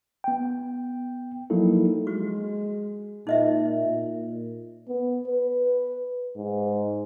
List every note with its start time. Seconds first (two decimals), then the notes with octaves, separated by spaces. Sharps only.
0.24 B3 G5
1.50 F3 F#3 A#3 D#4 E4 A4
2.07 G#3 F#4
3.27 A#2 D#4 D#5 E5
3.85 A#2
4.88 B3
5.27 B4
6.37 G#2